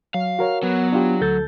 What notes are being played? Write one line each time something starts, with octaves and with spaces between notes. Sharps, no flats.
F#3 F5
F#4 A#4 C#5
F#3 B3
D4 F4 G4
D2 A4 G6 A6